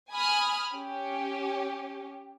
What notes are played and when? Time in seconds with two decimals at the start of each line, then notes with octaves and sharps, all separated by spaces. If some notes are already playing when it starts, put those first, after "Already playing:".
0.12 G#5 B5 D#6 F6
0.73 C#4 G4